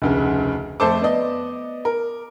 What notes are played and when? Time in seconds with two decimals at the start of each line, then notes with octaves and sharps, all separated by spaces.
0.02 F1 D2 C#3
0.80 F2 A3 A4 C5 A5 D6
1.01 B3 D5 D#5
1.85 A#4